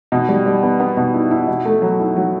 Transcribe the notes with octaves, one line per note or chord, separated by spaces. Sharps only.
B2
G3
G3
B3
B3
B2
E4
E4
B2
A3
F#3
E4
F#3